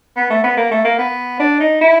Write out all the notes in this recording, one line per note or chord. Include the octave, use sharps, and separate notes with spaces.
B3
A3
B3
A#3
A3
A#3
B3
D4
D#4
E4